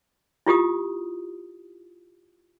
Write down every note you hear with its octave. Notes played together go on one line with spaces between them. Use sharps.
E4 F4 G4 D#6